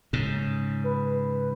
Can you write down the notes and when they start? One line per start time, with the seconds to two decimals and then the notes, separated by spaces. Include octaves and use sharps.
0.13 G#2 C#3
0.84 B4